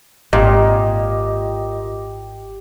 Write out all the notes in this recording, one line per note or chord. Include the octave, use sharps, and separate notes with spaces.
G#1 A#2 G4 D#5